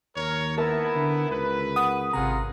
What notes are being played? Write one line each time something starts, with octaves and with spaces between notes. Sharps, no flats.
D#2 A#4 C#5
B3 E4 A#4 E5 A5
D3
C#2 B4
F#5 D#6
G#1 C3 F4 G#4 F#5 A#5